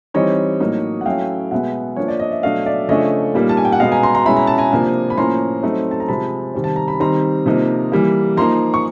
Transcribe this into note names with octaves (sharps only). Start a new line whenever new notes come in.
E3 G3 C4 D#4 C#5 D#5
A2 F#3 A#3 D#4
F#5
F#3 A3 C#4 E4 F5 G5
B2 G#3 B3 E5 F#5
F3 A#3 D4 C#5
D5
D#5
E5
B2 F#3 A3 D4 D#5 F5
D5 E5
C#3 F3 A3 D4 C#5 D#5
A#2 G3 A#3 D#4
A5
G#5
G5
F#5
B2 G#3 B3 D#5 F5
G#5 A#5
A#5 C6
A#5 C6
B2 G#3 C#4 E4 B5
A#5
A5
G#5 A#5
C3 F3 A#3 D4
B5
A2 F3 A#3 C#4 A#5 C6
F#3 A3 C4 D#4
A5
A#5
C3 F3 G#3 A5 B5
C3 D#3 G3 C4
A5
A#5
B5
D#3 G3 C4 D#4 A#5 C6
C3 F3 A#3 D#4
E3 G3 A#3
F3 A#3 D#4 A#5 C6
C#6